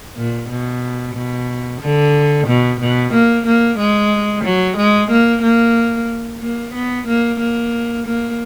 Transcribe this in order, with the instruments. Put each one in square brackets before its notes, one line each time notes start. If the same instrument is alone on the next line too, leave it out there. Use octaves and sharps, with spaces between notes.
[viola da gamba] A#2
B2
B2
D3
B2
B2
A#3
A#3
G#3
F#3
G#3
A#3
A#3
A#3
B3
A#3
A#3
A#3